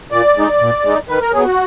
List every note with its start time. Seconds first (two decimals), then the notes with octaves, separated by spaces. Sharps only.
0.12 A#2 D5
0.36 G#3 D#4
0.60 A#2
0.84 G#3 D#4
1.09 D#3 B4
1.21 A#4
1.33 F#3 B3 G#4
1.45 F#4